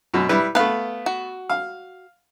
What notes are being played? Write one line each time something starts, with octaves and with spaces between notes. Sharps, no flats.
F#2 B2
G3 E4 B4
A3 B3 B4 F5
F#4
F5